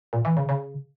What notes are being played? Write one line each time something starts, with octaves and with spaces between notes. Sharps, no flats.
A#2
E3
C#3
C#3